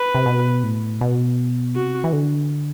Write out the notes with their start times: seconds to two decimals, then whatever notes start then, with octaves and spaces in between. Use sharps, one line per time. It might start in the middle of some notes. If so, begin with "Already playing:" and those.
Already playing: B4
0.15 C3
0.26 B2
0.63 A2
1.01 B2
1.76 C3 F#4
2.04 E3
2.13 D3